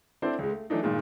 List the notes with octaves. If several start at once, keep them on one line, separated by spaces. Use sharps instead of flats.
C4 D4 E4 A4 C5 D5
C#2 G#3
A3
E3 F#3 A3 D4 D#4
G2 A#2 D#3 G#3